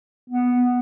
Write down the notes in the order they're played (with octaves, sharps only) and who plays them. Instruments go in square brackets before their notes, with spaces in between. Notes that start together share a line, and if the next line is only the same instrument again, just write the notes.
[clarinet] B3